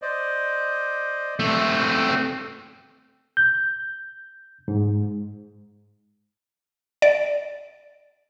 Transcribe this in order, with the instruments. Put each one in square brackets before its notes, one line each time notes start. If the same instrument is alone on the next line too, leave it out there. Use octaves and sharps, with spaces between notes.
[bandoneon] C5 D5 D#5
[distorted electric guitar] A3 C4
[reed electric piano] G6
G#2
[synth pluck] D5